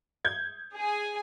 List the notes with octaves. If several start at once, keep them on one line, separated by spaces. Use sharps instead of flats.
G6 G#6
G#4 G#5